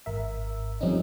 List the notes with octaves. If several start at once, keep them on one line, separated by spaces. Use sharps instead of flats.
G#1 A#4 E5
F2 G3 C4 C#4 D#4